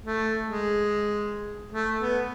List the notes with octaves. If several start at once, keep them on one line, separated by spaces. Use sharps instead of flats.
A3
G#3
A3
B3